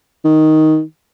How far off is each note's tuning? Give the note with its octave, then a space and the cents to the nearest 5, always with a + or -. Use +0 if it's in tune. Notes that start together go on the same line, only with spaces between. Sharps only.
D#3 +5